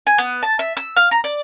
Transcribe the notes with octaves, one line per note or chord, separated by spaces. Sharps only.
G#5
B3
A5
E5
E6
F5
A#5
D5